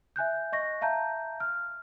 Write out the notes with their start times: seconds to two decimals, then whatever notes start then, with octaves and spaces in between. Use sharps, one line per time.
0.16 E5 G#5 F#6 G6
0.52 D#5 C#6 A#6
0.81 E5 F5 A5 A#5 G6
1.40 F6